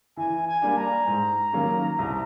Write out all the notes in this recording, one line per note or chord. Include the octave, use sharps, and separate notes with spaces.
E3 G#5
G#5
G3 A#3 D4
A#5
G#2
D#3 F#3 A#3 C#4
C2